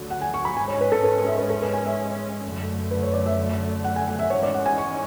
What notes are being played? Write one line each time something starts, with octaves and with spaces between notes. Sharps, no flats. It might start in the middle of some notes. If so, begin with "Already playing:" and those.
Already playing: D2 D3 F#3
F#5
G#5
C#6
B5
G#2 G#3 C#4 G#5
C#5
B4
A4
B4
E5
B4
A4
B4
G#5
E5
F#2 D3 A3
B4
C#5
D5
E5
F#5
G#5
F#5
E5
G#2 E3 G#3 C#4 C#5
D5
F#5
G#5
C#6